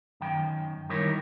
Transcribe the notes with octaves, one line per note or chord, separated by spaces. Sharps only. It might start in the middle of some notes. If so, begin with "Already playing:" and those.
F#2 D#3 G5
D#3 G3 D#4 E4 A#4 C#5